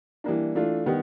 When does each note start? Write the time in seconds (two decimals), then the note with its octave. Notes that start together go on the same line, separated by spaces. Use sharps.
0.24 E3 G3 A#3 D4
0.55 E3 A3 D4 F4
0.86 D#3 G3 B3